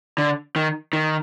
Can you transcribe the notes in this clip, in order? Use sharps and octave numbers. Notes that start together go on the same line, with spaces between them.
D3
D#3
D#3